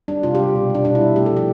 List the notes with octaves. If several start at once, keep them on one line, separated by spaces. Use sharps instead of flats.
G3 D4
C3 F4
G4
G3
B2
G3
D4
B2 D4
E4
G3
A3 G4
A4
F3 G4